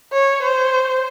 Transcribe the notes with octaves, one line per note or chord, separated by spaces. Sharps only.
C#5
C5